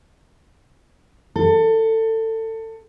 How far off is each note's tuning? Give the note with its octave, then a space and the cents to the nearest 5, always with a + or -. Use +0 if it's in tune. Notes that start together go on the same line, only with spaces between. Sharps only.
A4 +25